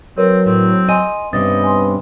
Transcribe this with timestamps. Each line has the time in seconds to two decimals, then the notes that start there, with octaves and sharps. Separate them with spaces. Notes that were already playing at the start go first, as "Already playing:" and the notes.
0.18 F#3 C4 A#4 B4 C#5
0.46 A2 C4
0.89 D#5 G#5 C6 D#7
1.33 G2 C3 B3 C#4 B4 D#5 A6
1.64 G#5 C6